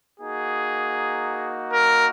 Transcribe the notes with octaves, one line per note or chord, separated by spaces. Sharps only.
A#3 D#4 F#4 G#4
A#4